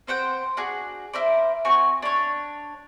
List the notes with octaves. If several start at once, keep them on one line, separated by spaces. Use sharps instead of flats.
C4 C5 F#5 G5
D4 F#4 G#4
E4 A#4 C5 D5
C4 F#4 G#5 C#6
D4 C#5